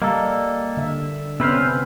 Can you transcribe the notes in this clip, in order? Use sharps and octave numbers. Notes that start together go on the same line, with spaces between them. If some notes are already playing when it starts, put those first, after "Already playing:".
G3 A#3 A4 D#5 A#5
D3 E5
C3 B3 C#4 B4 C5 E6 F6